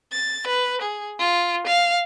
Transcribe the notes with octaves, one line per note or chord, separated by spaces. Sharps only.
A6
B4
G#4
F4
F5